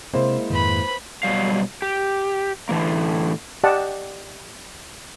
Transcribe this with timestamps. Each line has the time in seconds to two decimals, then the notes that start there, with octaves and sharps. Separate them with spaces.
0.14 C3 G#3 A#3 C4 E4 C5
0.50 F2 G#2 D#3 B4 B5
1.23 B2 F#3 G3 F5
1.82 G4
2.69 A2 D3 E3 A#3
3.64 G4 D5 D#5 F#5 A5